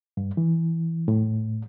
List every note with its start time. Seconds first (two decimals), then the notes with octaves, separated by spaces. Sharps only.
0.17 G2
0.37 E3
1.08 A2